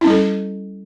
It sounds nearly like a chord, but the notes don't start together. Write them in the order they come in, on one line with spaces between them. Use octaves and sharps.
E4 C#4 G3 A4